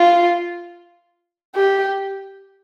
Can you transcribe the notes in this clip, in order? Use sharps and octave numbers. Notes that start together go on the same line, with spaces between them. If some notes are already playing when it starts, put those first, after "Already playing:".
Already playing: F4
G4